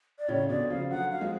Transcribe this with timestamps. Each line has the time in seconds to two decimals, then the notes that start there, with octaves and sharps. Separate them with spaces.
0.19 D5
0.28 A2 C#3 C#5
0.49 B2 D3 D5
0.69 C#3 F3 F5
0.91 D3 F#3 F#5
1.11 F5
1.21 F3 G#3